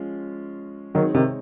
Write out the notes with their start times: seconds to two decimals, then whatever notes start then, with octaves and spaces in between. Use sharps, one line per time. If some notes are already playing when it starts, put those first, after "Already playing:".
Already playing: F3 G#3 C#4 F4
0.95 D#3 F#3 G#3 C4 D#4 G#4 C#5
1.14 C3 D#3